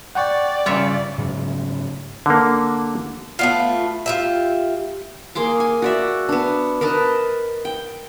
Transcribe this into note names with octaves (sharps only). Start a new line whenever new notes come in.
D5 F#5 G5 C#6
G2 C#3 F4 C#5 E5
G#2 C#3 F#3 G#3
D3 A#3
A3 B3 F4
F4 G4 E5
A#3 G#4 C6 D6
G#5
F#4 D5 E5
B3 D4
A#4 B4 D#5 A5
G5